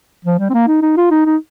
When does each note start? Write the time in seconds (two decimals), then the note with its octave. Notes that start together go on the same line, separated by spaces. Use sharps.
0.25 F3
0.39 G3
0.50 C4
0.54 A#3
0.68 D#4
0.82 D#4
0.97 F4
1.11 D#4
1.25 D#4